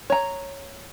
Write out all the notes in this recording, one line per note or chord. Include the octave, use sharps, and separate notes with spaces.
C#5 A#5